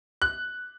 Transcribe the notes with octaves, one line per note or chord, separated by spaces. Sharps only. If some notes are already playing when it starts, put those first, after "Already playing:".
F#6